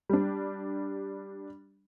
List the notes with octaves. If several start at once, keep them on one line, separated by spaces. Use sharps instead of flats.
G3 D4